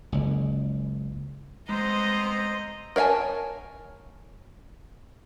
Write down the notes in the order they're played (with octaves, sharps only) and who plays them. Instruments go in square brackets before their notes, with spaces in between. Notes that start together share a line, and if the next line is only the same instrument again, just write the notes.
[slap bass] F#1 C#2
[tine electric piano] G#3 [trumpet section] B3 C4 A#5 [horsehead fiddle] C5 [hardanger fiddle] D#5
[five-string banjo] A#4 C#5 F5 G#5 A5